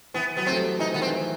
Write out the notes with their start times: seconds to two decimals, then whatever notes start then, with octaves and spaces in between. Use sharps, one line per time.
0.14 E3 B3
0.37 F#3 B3
0.46 A3 C4
0.57 G3
0.79 E3 D#4
0.93 D#3 B3
1.02 C4
1.06 E3